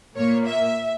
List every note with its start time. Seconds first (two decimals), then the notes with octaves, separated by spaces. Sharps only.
0.16 A#2 A#3 C#5
0.47 E5